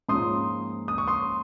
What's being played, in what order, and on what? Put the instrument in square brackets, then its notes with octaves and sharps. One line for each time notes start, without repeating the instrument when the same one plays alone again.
[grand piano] G#2 F3 A#3 C#4 C6 D#6
D#6
C#6
C6 D#6